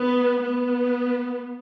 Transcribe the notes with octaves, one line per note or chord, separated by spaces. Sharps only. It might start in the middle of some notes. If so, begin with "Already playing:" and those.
Already playing: B3
B3